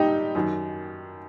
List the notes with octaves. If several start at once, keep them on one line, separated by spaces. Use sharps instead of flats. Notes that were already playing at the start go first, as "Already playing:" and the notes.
Already playing: G2 D#4 G4
F#2 D#3